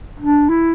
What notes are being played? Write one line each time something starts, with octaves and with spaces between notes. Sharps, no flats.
D4
E4